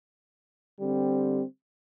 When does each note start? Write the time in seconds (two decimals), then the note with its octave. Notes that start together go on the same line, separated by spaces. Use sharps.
0.79 D3 G3 C4